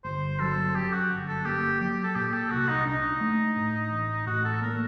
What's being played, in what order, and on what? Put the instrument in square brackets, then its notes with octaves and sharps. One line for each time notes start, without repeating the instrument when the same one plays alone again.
[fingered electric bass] G1 [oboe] C5
[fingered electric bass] F#3 [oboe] A4
[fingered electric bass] F#2 [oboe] G4
[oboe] F#4
[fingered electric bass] G1
[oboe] A4
[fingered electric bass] A#3 [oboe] G4
[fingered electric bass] F#3 [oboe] G4
[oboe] A4
[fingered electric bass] A#2 [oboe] G4
[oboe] A4
[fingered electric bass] C2 [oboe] F#4
[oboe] D#4
[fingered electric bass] D4 [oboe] D#4
[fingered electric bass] A3
A2
A1
[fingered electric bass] A2 [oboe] F#4
[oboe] A4
[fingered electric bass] A#3 [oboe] A#4